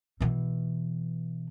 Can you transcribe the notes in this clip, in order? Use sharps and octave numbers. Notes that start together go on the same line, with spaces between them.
B2 E3